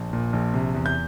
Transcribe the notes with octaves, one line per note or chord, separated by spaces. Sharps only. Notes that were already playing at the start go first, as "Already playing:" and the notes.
Already playing: A#1
A#2
A#1
C3
E2
G6